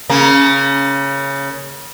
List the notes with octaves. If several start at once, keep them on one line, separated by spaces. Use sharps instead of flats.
C#3 A#3